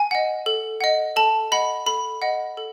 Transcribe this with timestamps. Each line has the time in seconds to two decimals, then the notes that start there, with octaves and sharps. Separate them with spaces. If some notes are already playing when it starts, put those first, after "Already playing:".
Already playing: G#5
0.11 D#5 F#5
0.46 A4
0.81 D#5 F#5
1.16 A4 A5
1.52 D#5 F#5 B5
1.86 A4 B5
2.22 D#5 F#5
2.57 A4